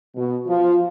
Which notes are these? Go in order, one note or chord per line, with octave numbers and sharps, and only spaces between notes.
B2
F3